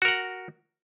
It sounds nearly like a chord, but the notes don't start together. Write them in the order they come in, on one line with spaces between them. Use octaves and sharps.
F#4 A#4 F#5